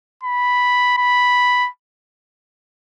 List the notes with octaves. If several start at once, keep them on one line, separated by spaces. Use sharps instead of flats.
B5
B5